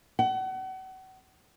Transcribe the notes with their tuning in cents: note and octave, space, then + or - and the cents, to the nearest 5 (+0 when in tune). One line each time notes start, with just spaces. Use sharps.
F#5 +35